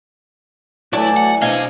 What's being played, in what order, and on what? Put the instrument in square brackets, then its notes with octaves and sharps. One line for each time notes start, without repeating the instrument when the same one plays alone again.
[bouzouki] E3 [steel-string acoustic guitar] F#3 A3 [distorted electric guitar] E4 [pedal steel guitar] F#4 D5 A5
[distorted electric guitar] F#5
[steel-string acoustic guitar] B2 C4 D4 [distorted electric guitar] G4 D#5 [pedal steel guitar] F5 G#5